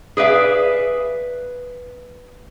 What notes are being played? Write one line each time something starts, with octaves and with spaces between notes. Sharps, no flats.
G#4 B4 D5 E5 F5